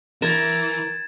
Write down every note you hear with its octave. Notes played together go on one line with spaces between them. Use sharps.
E3 A#4 G#6 A6 E7